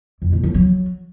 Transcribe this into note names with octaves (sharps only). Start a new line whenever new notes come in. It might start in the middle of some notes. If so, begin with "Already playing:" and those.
F2
A2
C#3
F#3